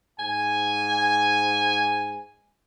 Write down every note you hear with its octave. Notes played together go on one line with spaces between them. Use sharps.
G#2 G#5